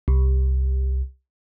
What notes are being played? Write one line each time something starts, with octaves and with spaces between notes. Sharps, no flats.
C2